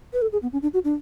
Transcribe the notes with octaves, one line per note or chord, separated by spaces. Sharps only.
B4
A4
G#4
B3
C#4
D4
F#4
D4